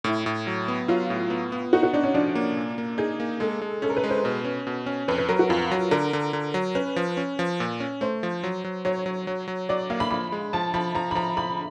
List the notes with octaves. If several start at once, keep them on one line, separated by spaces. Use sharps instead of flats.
A2 E4
A2
F#3
B3
F#3 F4
A2
B3
B3
D#4 F#4
F#4
D4 D#4
C#4
F3 D4
A#3
A#2
A#3
D#4 G#4
A#3
G#3 A4
G#3
C#4 A4
A#4
B4
G#3
C5
B2 B4
C#4
B2
C#4
F2 B4
B4
F#3 A#4
F#4
F2 F4
F#3
D3 A#4
D3
D3
F#3
C#4 B4
F3
C#4
F3
A#2
C#4
A3 C5
F3
F#3
F#3
F#3 C#5
F#3
F#3
F#3
F#3 D5
A#3 F5
B5
F3 B5
G#3
F3 A5
F3 B5
F3 A#5
B5
F3 A#5
F3 B5